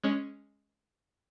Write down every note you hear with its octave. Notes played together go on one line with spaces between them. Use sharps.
G#3 C#4